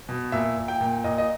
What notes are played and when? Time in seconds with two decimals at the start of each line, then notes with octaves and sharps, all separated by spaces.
0.09 B2
0.32 A#2 E5
0.56 A#2
0.68 G5
0.81 A#2
1.04 A#2 D#5
1.18 D#5